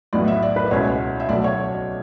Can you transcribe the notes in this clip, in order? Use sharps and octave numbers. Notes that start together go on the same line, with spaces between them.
B1 A2 E3 B3 D5
E5
D5
B4
D5
C#2 B2 A3 C#4 E4 C#5
E5
B1 B2 A3 D5
C#5
D5